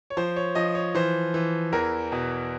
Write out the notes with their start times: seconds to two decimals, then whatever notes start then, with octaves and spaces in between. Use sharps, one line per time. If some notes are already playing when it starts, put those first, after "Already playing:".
0.10 C#5
0.17 F3 C5
0.36 C#5
0.55 F3 D#5
0.75 C#5
0.95 E3 C5
1.34 E3
1.72 E2 A#4
2.12 B2